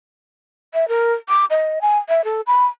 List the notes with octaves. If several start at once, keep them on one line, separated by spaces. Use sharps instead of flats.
E5
A#4
D6
D#5
G#5
E5
A4
B5